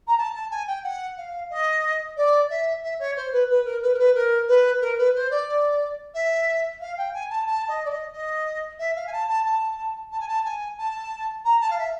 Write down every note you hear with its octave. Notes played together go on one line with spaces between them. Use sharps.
A#5
A5
A5
G#5
G5
F#5
F5
D#5
D5
E5
E5
C#5
C5
B4
B4
A#4
B4
A#4
B4
A#4
B4
A#4
B4
C5
D5
E5
F5
G5
G#5
A5
A5
D#5
D5
D#5
D#5
E5
F5
G#5
A5
A5
A5
A5
G#5
A5
G#5
A5
A#5
A5
F5
E5